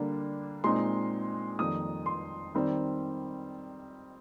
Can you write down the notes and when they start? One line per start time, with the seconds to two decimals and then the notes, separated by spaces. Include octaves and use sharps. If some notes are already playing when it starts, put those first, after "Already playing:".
Already playing: D3 G3 A#3 D4
0.64 A#2 G#3 C4 D#4 C6
1.59 F2 D#3 G3 A#3 D#4 D#6
2.06 C6
2.55 D#3 G3 C4 D#4